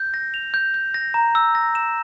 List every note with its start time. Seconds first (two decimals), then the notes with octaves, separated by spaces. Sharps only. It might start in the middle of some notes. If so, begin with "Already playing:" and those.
Already playing: G6
0.14 A#6
0.34 F7
0.54 G6
0.74 G6
0.94 A#6
1.14 A#5
1.35 E6
1.55 A#6
1.75 E7